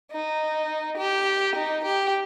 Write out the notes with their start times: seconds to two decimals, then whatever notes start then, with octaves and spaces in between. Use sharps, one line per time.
0.12 D#4
0.98 G4
1.56 D#4
1.85 G4